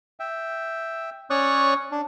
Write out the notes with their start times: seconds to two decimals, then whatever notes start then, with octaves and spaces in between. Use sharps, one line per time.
0.20 E5 G5
1.30 C#4 C#5 D5 C#6 D#6 F#6
1.92 D4